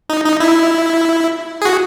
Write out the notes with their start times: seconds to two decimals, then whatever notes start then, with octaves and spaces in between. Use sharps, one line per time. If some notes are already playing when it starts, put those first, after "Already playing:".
0.09 D#4
0.25 D#4
0.40 E4
1.62 G#4
1.65 F#4